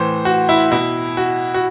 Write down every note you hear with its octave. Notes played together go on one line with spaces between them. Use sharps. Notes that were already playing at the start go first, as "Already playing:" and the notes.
Already playing: A2 E3 C5
F#4
E4
B2 E4
F#4
F#4